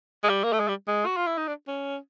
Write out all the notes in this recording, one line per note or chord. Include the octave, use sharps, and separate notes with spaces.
G#3
G3
A#3
A3
G#3
G3
G#3
F#4
F4
E4
D#4
D4
C#4